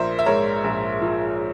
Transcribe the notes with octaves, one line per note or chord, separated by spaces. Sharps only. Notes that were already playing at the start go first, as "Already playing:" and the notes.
Already playing: A#1 F3 A#4 C5 E5
E5
G#2 A#4 C#5
A#1
F3